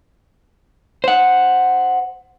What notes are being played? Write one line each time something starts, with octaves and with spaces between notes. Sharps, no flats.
C5 F#5